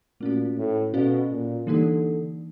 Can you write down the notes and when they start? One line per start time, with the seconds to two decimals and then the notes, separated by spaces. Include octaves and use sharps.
0.21 A#2 A3 C#4 F#4
0.58 A2
0.93 B2 C#4 F#4 A4 D5 F5
1.31 A#2
1.67 D3 E3 G3 A#3 D#4 G4